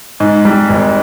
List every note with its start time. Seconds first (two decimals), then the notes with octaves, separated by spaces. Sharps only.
0.20 G#2
0.45 G3
0.69 G#1